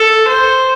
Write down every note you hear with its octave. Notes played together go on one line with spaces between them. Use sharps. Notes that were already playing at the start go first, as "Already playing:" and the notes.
Already playing: A4
C5